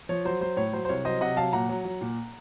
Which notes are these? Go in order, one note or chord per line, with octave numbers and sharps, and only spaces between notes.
F3 C#5
F#3 C5
F#3 C5
A2 C#5
F#3 C5
C5
C2 C#5
F#3 C5 D#5
C3 D#5 F#5
F#3 F5 A5
A#2 F#5 A#5
F#3
F#3
A#2